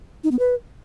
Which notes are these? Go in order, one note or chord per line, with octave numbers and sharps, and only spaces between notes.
D#4
B3
B4